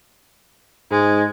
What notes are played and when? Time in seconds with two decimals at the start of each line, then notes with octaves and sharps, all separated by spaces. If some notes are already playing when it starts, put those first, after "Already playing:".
0.91 G#2 G#3